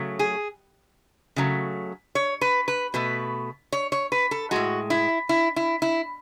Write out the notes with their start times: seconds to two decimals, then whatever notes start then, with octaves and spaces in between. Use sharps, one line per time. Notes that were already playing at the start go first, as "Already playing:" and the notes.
Already playing: C#3 F#3 A3
0.19 G#4
1.36 C#3 F#3 A3
2.15 C#5
2.41 B4
2.68 B4
2.94 B2 A3 B4
3.72 C#5
3.92 C#5
4.12 B4
4.31 A4
4.51 A2 G#3 F#4
4.90 E4
5.29 E4
5.56 E4
5.82 E4